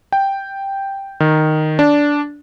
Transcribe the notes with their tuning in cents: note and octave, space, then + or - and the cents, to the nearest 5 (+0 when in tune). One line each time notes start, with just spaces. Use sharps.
G5 +0
D#3 -5
D4 -10